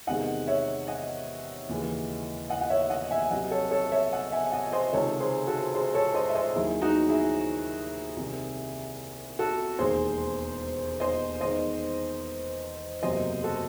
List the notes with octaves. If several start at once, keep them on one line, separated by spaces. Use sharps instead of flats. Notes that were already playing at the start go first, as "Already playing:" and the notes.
E2 C3 D#3 G#3 D#5 F#5
C#5 E5
D#5 F#5
D#2 C#3 E3 G#3
D#5 F#5
F#5
C#5 E5
D#5 F#5
E5 G#5
C2 C3 F#3 D#5 F#5
A4 C#5
A4 C#5
C#5 E5
D#5 F#5
E5 G#5
D#5 F#5
C5 D#5
C#2 C3 D#3 A4 C#5
G#4 C5
F#4 A4
G#4 C5
A4 C#5
C5 D#5
E5
C5 D#5
D#2 D#3 F#3 E4 G#4
D#4 F#4
E4 G#4
C2 C3 D#3
F#4 A4
E1 D#2 D#3 G#3 G#4 C5
C5 D#5
E2 D#3 G#3 C5 D#5
F#1 E2 C3 F#3 C5 D#5
F#4 A4